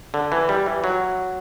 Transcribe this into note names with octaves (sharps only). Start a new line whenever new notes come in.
D3
E3
G3
E3
F#3